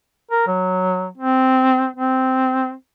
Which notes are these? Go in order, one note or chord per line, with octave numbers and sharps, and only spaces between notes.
A#4
F#3
C4
C4